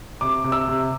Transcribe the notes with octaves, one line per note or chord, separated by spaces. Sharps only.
C3 D6
C3
E6
C3